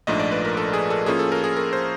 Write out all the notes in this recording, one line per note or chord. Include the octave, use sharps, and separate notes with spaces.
A#1 G#2 F3 A3 D4 D#5
D5
B4
A#4
A4
G#4
A4
A2 F3 A#3 C#4 F4 G#4
A4
A#4
G#4
A#4
C5